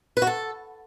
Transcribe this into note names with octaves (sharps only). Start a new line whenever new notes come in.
B4
F#4
A4